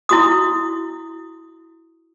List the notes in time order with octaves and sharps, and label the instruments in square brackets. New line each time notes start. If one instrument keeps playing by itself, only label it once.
[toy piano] E4 F#4 D#6